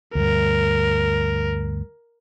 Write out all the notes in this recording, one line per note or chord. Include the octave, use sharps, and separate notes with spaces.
D2 G2 A#4